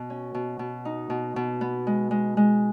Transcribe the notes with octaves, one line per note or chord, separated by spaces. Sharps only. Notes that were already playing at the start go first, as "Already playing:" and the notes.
Already playing: B2
C#4
B2
B2
D#4
B2
B2
B3
G#3
G#3
G#3